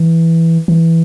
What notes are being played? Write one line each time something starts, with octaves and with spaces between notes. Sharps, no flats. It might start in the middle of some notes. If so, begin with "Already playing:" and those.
Already playing: E3
E3